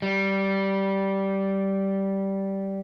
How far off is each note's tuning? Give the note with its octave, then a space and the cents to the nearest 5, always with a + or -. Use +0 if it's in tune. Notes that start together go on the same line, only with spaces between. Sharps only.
G3 -10